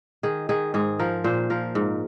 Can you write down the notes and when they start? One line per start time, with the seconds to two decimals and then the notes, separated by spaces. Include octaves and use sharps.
0.23 D#3 G#4
0.49 D#3 G#4
0.74 G#2 G#4
0.99 F3 A#4
1.24 A#2 C5
1.50 F3 A#4
1.75 G#2